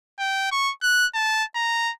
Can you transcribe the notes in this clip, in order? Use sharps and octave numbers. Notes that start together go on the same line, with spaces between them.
G5
C#6
F#6
A5
A#5